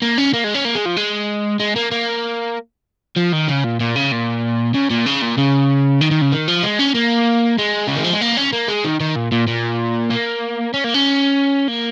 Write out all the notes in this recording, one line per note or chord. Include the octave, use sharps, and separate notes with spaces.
A#3
C#4
A#3
G#3
C#4
A#3
G#3
F3
G#3
G#3
A#3
A#3
F3
D#3
C#3
A#2
A#2
C#3
A#2
C#3
A#2
C#3
A#2
C#3
D#3
D#3
C#3
D#3
F3
G#3
C#4
A#3
G#3
C#3
D#3
F3
G#3
A#3
C#4
A#3
G#3
D#3
D#3
A#2
A#2
A#2
A#3
C#4
A#3
C#4
A#3